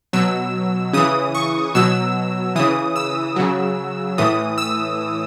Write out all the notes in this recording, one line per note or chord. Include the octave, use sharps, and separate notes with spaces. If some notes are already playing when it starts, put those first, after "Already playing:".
B2 F#3 E6
C#3 E3 D#6
C#6
B2 F#3 E6
C#3 E3 D#6
E6
C#3 F#3
A2 E3 D#6
E6